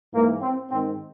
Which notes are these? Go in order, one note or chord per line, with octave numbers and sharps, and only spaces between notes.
G#2 E3 A#3
C4
G#2 D#3 C4